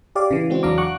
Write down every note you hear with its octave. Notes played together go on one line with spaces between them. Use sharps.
G4 D5 F5
C#3 E3
G#3 C4 F#4
E2 F#3 D4 F5 A#5 D6
F#5 C#6 D6 F#6